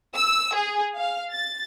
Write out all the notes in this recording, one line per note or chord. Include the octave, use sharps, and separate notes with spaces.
E6
G#4
F5
A6